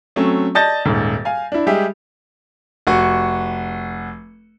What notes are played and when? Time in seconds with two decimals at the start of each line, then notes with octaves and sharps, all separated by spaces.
0.16 F#3 A3 C4 C#4
0.55 D5 D#5 A5 G6 A6 A#6
0.85 D#1 G#2
1.25 F5 G#5
1.52 D4 E4
1.67 G3 G#3 G4 G#4 E5
2.87 F1 F#4 C#6